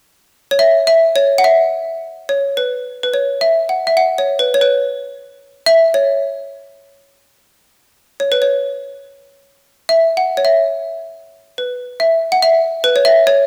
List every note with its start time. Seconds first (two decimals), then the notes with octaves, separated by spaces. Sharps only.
0.51 C#5
0.59 E5
0.87 E5
1.16 C#5
1.38 F#5
1.44 E5
2.29 C#5
2.57 B4
3.03 B4
3.14 C#5
3.41 E5
3.69 F#5
3.87 E5
3.97 F#5
4.18 C#5
4.39 B4
4.54 C#5
4.61 B4
5.66 E5
5.94 C#5
8.20 C#5
8.32 B4
8.42 C#5
9.89 E5
10.17 F#5
10.37 C#5
10.45 E5
11.58 B4
12.00 E5
12.32 F#5
12.42 E5
12.84 B4
12.96 C#5
13.05 E5
13.27 C#5